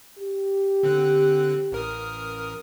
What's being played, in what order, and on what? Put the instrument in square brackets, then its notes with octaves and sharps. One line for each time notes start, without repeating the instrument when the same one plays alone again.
[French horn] G4
[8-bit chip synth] D3 C4 F#6
A1 A#4 D#6